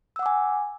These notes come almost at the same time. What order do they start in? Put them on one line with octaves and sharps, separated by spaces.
E6 F#5 D6 G#5